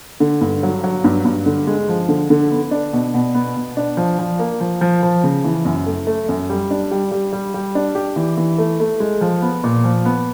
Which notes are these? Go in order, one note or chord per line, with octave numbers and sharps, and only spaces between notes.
D3
G2
F#3
F#3
G2
G2
D3
G#3
F3
D3
D3
B3
D4
B2
B2
B3
B2
D4
F3
F3
A#3
F3
F3
F3
C#3
E3
F#2
A3
A3
F#2
G3
D4
G3
G3
G3
G3
D4
G4
E3
E3
A3
A3
G#3
F3
B3
A#2
F3
B3